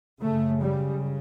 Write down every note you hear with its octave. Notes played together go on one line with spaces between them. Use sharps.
F#2 C#3 A3
G3